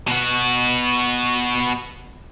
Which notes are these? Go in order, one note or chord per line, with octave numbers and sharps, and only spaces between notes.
B2 F#4